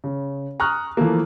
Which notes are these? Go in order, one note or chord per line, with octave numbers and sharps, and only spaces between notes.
C#3
A#5 C#6 D#6 F6 F#6
E3 F3 A3 A#3